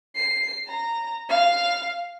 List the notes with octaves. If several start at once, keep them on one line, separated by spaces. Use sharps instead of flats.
C7
A#5
F5